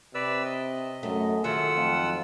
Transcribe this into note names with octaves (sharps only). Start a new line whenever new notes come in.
C3 B4 D5 E6
D#5
F#2 A3
D#3 F#3 G#3 A3 F4 F#5 E6
F2